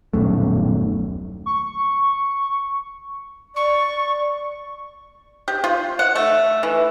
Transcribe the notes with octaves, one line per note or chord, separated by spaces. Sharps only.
D#1 B1 F#2 A3
C#6
D5 C#6
G4
F4
F#5
A3
E3